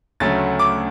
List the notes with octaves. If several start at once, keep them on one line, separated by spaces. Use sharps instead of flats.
D2 C#3 F#3 A3 A6
D6